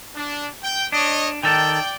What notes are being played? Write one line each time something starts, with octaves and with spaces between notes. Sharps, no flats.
D4
G5
D4 C#5 D#5
D#3 A4 D5 G5